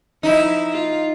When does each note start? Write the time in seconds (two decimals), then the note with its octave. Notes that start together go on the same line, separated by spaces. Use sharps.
0.23 F3 D#4 E4
0.72 F4